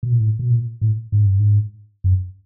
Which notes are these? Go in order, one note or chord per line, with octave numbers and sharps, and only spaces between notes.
B2
A#2
A2
B2
A#2
A2
G#2
G2
G#2
F#2